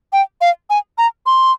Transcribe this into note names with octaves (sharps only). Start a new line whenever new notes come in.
G5
F5
G#5
A#5
C6